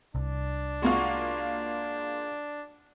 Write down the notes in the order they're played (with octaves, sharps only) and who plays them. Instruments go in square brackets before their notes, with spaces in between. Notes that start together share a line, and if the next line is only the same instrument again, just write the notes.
[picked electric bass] C2 [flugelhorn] D4
[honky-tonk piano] G#3 A#3 F4 [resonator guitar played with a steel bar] F#4